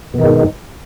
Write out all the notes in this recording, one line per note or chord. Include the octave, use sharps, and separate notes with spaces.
G#2 B2 D#3